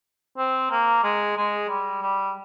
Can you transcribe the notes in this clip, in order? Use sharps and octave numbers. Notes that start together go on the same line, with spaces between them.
C4
A#3
G#3
G#3
G3
G3